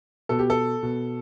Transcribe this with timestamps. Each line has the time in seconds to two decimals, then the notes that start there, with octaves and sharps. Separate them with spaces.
0.29 B2 A4
0.39 G4
0.50 A4
0.83 B2